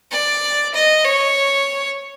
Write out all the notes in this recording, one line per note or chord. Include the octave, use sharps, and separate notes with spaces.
D5
D#5
C#5